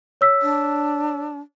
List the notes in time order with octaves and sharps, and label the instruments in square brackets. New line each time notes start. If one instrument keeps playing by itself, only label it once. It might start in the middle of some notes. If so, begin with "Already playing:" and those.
[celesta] C#5 E6 B6
[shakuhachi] D4